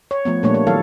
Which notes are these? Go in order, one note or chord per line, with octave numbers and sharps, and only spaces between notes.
C#5
F3 A3 B3
A#2 G3 A3 A#3 D4 C#5
C#5
D#3 F#3 E4 A4 F5